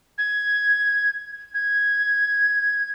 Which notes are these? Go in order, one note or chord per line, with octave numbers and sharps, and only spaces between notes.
G#6
G#6